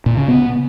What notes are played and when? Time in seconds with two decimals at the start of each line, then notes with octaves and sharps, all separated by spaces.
0.06 A#2
0.17 C#3
0.28 B3